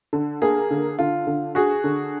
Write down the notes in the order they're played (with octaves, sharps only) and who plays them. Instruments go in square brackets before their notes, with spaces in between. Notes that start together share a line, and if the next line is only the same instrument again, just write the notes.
[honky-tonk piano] D3
[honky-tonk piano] A#3 [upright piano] G#4
[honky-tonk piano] D3
[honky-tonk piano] D3 [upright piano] F4
[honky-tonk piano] D3
[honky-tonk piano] F#4 [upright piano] G#4
[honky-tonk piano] D3